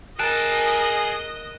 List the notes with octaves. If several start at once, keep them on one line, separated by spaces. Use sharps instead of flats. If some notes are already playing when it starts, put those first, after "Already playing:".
G#4 A#4 D#5 A5 F#6 D7 E7